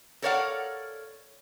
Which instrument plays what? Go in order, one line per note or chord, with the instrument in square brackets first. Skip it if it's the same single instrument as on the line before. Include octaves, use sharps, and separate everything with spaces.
[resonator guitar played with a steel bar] A4 A#4 C#5 D5 F5 F#5